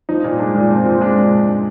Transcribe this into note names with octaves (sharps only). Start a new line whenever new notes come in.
F3 D#4
A#2
G#3 D4
A#2
F3 C4
A#2
G#3 D4